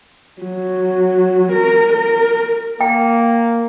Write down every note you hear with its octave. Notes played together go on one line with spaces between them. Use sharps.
F#3
A#4
A#4
A#3 G5